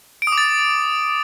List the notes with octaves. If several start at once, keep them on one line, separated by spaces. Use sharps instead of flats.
D7
D#6
D6
A6